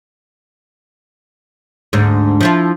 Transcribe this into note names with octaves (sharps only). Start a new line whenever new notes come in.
D2 G#2
F3 E4 F4